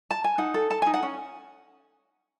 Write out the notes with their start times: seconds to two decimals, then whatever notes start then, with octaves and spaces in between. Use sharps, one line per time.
0.11 A5
0.24 G#5
0.38 D#4 F#5
0.54 A4
0.70 A4 A5
0.82 D#4 G#5
0.94 F#5
1.03 C#4